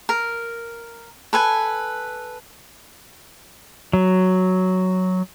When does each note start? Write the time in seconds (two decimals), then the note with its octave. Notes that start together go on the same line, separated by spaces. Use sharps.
0.09 A#4
1.33 A4 B4 G#5
3.93 F#3